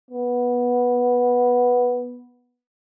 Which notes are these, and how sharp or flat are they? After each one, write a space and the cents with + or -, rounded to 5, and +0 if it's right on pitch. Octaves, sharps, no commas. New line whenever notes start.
B3 -10